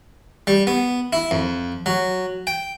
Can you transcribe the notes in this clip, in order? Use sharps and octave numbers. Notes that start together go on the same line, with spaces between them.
G3
B3
E4
F2
F#3
G5